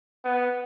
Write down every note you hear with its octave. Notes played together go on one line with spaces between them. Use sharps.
B3